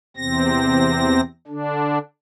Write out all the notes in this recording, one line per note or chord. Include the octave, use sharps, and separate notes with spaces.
E2 C3 C4 A#6
D3 D4